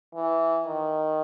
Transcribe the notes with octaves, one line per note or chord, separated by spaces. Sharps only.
E3
D#3